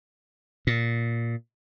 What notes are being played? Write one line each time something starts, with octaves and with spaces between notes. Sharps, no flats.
A#2